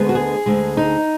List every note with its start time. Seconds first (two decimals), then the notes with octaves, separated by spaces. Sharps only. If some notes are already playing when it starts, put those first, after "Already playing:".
Already playing: D2 D3 G#3 B3
0.09 F#4
0.15 G#4
0.46 D2 D3 G#3
0.77 D#4